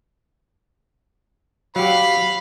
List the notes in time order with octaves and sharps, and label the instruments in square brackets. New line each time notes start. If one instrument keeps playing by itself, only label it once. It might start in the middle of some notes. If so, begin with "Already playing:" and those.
[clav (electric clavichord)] F#3 G4 [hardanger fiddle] F5 [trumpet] B5